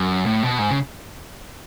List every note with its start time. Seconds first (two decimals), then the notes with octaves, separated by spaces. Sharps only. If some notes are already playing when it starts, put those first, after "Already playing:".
Already playing: F#2
0.26 A2
0.43 B2
0.59 G#2
0.71 C#3